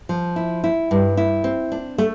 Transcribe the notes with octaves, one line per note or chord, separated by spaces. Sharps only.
F3
E4
E4
G2
E4
C4
D4
A3